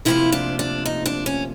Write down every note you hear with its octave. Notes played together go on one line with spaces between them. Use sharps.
D2 C3 F3 A#3 E4
D4
D4
D#4
D4
C#4